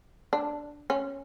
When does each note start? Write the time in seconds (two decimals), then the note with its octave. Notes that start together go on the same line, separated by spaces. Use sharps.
0.33 D4
0.90 C#4